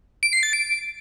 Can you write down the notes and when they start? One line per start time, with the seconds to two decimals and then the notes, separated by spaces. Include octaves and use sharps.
0.23 D7
0.33 C7
0.43 A6
0.53 D7